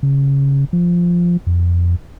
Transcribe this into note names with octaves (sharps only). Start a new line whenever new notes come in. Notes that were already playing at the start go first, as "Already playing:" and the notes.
C#3
F3
F2